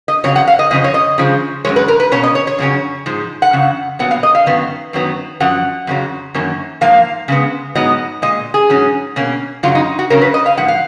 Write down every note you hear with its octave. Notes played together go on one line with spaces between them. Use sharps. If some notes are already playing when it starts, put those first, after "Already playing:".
D#5
F2 C#3 F#3 C#5
F#5
F5
D#5
F2 C#3 F3 D#5
C#5
D#5
C#3 F3 G#3
F#2 F3 G#3 C#5
B4
A#4
B4
B2 A#3 C#4 C#5
D#5
C#5
C#5
F2 C#3 F#3 C#4
G#2 F3 G#3
F#5
F2 C#3
A#2 F#3 B3 F#5
F5
D#5
F5
F#2 D#3 F#3 B3
F#2 D#3 F#3 B3
F#2 F3 F#5
F2 C#3 F#3
F#2 D#3 A#3 C#4
G#2 F3 A#3 F5
C#3 G#3 B3
G#2 F#3 B3 D#5
A#2 G#3 D#5
G#4
G#2 F#3 C#4
B2 A#3 C#4
F#2 C#3 F#3 F4
D#4
F#4
C#3 F#3 C#4 A#4
B4
D#5
F5
G#2 F3 F#5
F5